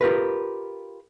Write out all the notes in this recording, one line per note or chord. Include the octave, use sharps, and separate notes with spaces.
F4 G4 A#4 B4